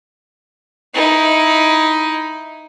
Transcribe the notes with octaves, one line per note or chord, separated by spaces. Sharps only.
D#4 E4